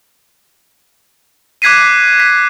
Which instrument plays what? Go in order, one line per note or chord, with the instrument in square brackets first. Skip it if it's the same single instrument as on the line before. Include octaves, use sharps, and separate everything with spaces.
[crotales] D6 F#6 G#6 B6 C7 D#7
B6